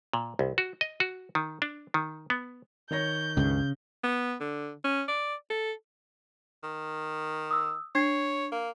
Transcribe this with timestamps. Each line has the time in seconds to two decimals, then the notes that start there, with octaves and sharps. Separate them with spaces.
0.13 A#2
0.39 C2
0.58 F#4
0.81 D#5
1.00 F#4
1.35 D#3
1.62 D4
1.94 D#3
2.30 B3
2.91 D#3 C#5 G6 A#6
3.37 C#2 G2 C#3
4.04 B3
4.40 D3
4.84 C#4
5.08 D5
5.50 A4
6.63 D#3
7.51 D#6 E6
7.95 D4 C#5 G#6 C7
8.52 A#3